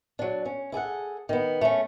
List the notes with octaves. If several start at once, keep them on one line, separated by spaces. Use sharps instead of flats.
F#3 D4
C#4
E4 G#4 A4 F#5
D#3 B3
A3 C#4